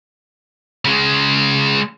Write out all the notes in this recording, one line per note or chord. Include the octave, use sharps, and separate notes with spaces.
C#3 G#3